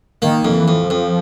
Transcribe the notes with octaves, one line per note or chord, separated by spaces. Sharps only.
D#3 A#3
F2
E3
F2
F3
F2